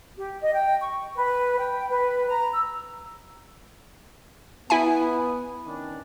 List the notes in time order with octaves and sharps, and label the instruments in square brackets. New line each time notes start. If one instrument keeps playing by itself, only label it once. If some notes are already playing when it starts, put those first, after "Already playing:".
[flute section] G4
D#5
G5
C#6
B4
G5
B4
A#5
E6
[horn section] B3 [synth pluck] E4 E5 G#5
[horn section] D#3 C#4 D4